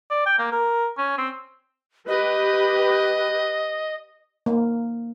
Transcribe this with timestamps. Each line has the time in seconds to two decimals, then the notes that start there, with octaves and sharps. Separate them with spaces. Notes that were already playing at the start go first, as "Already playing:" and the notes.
0.10 D5
0.26 G5
0.39 A#3
0.52 A#4
0.98 C#4
1.18 C4
2.08 G4 B4 D#5
4.46 A#3